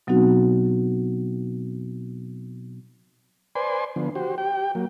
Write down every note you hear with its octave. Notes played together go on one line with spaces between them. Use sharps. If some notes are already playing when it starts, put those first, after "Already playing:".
B2 F#3 B3 C4 D#4 F#4
B4 C5 D5 G#5 C6
D3 F3 B3
F#4 G4 C5
G4 G5
F#3 A#3